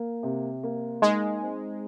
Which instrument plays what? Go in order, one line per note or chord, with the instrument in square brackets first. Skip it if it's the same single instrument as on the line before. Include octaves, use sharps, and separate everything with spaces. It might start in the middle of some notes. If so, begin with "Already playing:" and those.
Already playing: [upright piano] A#3
C3
A#3
[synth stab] G#3 [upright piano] D#4
[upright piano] C4